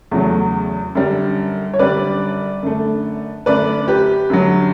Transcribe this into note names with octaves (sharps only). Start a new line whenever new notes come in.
E2 C#3 F#3 A3
F#2 D3 G3
C#5
F#2 D3 G3 B4 D5
F#2 D3 A3
F#2 D3 A3 B4 D5
G4 B4
F#2 D3 F#3